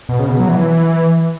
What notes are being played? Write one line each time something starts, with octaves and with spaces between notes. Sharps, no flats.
B2
C#3
B2
F#3
E3